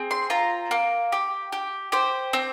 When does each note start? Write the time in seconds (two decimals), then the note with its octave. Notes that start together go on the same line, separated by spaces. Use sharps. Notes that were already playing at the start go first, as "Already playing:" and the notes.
Already playing: C4 G#4
0.11 C6
0.30 F4 A#5
0.71 A#3
1.12 G4
1.52 G4
1.92 G4 C5
2.33 C4